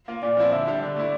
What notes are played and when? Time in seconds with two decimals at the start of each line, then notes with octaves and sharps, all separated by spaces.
0.08 A#3 F4
0.23 A#2 D5
0.37 F3 C4 E4
0.52 D3 E5
0.67 G3 D4 G4
0.82 D3 D5
0.96 A3 E4